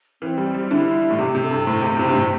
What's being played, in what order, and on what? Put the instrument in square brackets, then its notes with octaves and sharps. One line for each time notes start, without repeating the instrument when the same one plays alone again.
[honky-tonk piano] E3 [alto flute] C4
[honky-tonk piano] G3
G3
[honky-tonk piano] D3 [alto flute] E4
[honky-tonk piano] A2
[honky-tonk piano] C3 [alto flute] G4
[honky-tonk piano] C3
[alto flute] A4
[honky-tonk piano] G2
[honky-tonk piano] A2 [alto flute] C5
[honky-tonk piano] C3
C3
G2
[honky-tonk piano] A2 [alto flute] C5